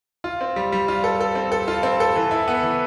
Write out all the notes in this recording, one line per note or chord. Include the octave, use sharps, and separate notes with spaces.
F4
C4
G3
G3
F4
A4
A4
C4
A4
F4
C4
A4
E3
E4
B3
E3